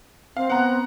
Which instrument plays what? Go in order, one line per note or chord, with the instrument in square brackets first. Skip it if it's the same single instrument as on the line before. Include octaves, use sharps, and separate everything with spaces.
[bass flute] C4 [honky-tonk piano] F5
[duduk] B3 [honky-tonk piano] F#5 A#5 F#6